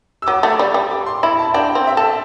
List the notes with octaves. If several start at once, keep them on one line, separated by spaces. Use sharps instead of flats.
E6
F#3 D6
A3
D6
G3
G3
D6
C6
E4 B5
A5
D4 G5
C4
E5
A4